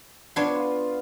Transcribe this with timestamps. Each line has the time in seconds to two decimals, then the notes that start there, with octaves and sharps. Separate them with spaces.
0.36 B3 D4 F4 C#5 C6
0.56 F4